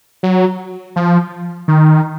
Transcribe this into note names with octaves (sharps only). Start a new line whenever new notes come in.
F#3
F3
D#3